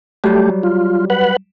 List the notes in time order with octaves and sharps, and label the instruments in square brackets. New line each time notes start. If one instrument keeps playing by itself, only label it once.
[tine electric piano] F#3 G3 [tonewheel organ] A3 G4
[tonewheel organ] F4
B4 F#5